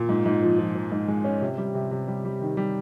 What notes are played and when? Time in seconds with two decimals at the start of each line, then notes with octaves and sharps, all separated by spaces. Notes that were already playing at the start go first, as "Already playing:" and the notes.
Already playing: A#2
0.09 G#2
0.26 G#2
0.42 F3
0.58 F3
0.75 F3
0.92 G#2
1.08 G#3
1.24 C#4
1.41 C3
1.58 G3
1.74 C3
1.91 C3
2.08 G3
2.25 G3
2.41 D#3
2.57 G3